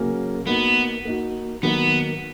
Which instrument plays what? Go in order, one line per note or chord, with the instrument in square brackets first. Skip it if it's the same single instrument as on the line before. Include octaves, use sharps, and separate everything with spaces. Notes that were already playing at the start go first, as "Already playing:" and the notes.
Already playing: [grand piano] C#3 F#3 A#3 C#4
[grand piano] A#3 D#4 F#4 [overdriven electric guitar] B3
[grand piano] A#3 D#4 F#4
[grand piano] D#3 F#3 A#3 D#4 [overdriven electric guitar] B3